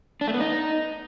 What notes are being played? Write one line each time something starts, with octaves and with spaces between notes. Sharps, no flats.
D4
A3
B3
D#4